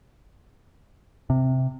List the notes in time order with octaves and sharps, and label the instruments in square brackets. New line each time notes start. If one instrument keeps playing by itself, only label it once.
[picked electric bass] C3